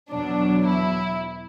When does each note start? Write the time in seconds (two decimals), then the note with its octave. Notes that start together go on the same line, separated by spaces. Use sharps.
0.11 E2 B2 F#3 D4
0.67 E4